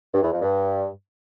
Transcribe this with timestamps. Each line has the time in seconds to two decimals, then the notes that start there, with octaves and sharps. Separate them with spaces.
0.14 G2
0.23 E2
0.33 F2
0.42 G2